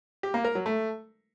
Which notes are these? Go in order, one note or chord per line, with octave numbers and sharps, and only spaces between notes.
G4
A#3
A#4
F#3
A3